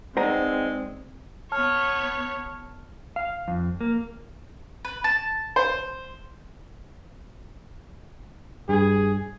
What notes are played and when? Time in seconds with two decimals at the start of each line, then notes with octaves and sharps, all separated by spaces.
0.17 G#3 C4 D#4 B4 C5 D5 F#5 A#5
1.52 B3 C#5 A5 F6
3.16 F5
3.48 F2
3.81 A#3
4.85 B4
5.04 A5
5.56 C5
8.69 G2 G#4